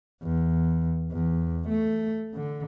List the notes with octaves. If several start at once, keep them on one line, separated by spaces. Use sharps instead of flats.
E2
E2
A3
D3